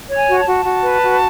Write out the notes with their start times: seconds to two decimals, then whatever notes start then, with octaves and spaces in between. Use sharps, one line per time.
0.09 C#5
0.15 G#5
0.27 F#4
0.40 A5
0.46 F#4
0.64 F#4
0.83 B4
1.02 F#4